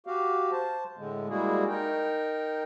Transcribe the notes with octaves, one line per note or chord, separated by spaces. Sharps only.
F#4 G4 F5
C5 A5
A2 D3 G#3
G3 G#3 A#3 E4 F#4 G#4
D#4 A#4 G5